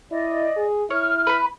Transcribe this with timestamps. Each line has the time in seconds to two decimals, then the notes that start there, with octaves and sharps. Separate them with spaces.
0.11 E4 D5 D#5
0.56 G#4
0.90 E4 C#5 F6
1.27 B4 B5